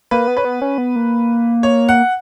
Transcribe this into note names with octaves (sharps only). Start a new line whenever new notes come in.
A#3 B4
B3
C#4 B4
B3
C#4
B3
A#3
C#5
F#5